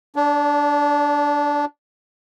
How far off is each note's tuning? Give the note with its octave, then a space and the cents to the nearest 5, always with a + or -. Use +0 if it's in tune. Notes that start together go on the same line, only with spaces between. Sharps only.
D4 -10 D5 -45